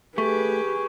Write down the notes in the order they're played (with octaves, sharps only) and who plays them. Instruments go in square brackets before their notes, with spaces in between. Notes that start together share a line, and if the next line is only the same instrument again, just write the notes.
[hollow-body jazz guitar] A3 [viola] G4 [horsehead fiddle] G#4 B4 [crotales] C#6